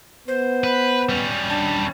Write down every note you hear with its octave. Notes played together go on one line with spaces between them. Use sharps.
B3 C5
B4
G3 C#4
D4 A5